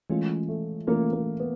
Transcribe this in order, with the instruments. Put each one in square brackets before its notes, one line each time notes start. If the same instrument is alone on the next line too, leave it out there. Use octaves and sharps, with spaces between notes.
[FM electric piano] E3 A3 C#4 F4 [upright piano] G#3
[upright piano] A3
[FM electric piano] E3 A3 C#4 F4 [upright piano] A#3
[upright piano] A#3
B3